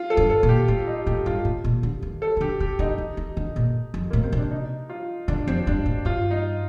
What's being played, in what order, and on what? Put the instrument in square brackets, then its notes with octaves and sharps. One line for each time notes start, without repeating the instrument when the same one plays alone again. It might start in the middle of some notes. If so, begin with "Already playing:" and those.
Already playing: [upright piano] F4
A4
[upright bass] G2
[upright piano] A4
[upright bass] A#2
[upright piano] G4
[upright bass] A2 [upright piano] F4
[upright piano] D#4
[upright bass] A2 [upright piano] G4
[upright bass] G2 [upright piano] F4
[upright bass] A2
A#2
D3
D#3
[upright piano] A4
[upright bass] D#3
[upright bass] D3 [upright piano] G4
[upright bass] C3 [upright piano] G4
[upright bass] D3 [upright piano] D#4
[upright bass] D#3
D#3
D3
A#2
F2
[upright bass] A2 [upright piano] A#3
[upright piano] C4
[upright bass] C3
[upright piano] D4
D#4
F4
[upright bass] D3 [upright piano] D4
[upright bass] F2 [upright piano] C4
[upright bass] G2 [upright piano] D4
[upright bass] A2
[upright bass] G2 [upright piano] F4
[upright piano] D#4